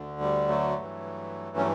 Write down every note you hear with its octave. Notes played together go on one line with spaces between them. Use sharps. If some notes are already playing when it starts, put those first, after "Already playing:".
Already playing: D2 D3
G3
F#3 A3
G2 E3
C#4